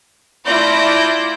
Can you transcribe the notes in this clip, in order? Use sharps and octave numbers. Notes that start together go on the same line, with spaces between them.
A3 E4 F4 D5 G6 A#6